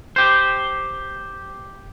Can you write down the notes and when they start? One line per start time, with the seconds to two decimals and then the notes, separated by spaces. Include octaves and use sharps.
0.16 G4 C5